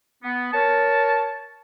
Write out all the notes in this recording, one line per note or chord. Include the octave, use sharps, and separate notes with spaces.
B3
A#4 C#5 A5